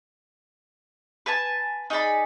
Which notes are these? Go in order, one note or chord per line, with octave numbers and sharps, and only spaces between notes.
B4 G#5 A5
D#4 G#4 D5 B5